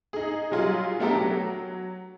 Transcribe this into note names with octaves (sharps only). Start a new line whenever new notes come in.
D#4 G#4
F#3 G3 F4 G#4
A3 B3 D4 G4 A4 A#4
F#3